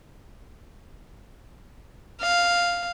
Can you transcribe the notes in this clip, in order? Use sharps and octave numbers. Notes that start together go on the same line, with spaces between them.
F5